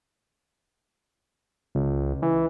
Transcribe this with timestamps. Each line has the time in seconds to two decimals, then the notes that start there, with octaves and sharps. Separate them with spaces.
1.75 C#2
2.22 E3